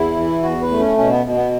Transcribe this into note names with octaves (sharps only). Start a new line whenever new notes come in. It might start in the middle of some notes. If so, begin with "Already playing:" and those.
Already playing: E2 E4
E3
E2 F#4
B4
A3
C#4
B2 C#4
B3
B2
B3